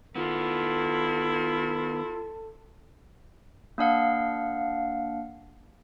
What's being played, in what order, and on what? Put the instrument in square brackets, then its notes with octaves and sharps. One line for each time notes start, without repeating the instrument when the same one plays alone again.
[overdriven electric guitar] D#3 B3 [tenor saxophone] E4 [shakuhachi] F4 [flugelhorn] A4
[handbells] A#3 D4 F5 F#5